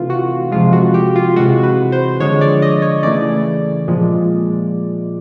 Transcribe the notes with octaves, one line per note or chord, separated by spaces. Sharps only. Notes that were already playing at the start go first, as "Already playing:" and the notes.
Already playing: C3 E3 A3 F4
F#4
C3 F3 G#3 F4
F#4
G4
F4
C3 E3 G#3 F#4
B4
C5
D3 F3 G#3 C#5
D5
D#5
C#5
C#3 E3 A3 D5
A#2 F3 G#3